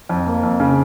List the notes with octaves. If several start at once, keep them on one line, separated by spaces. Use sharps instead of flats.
F2
A#3
F2
C#3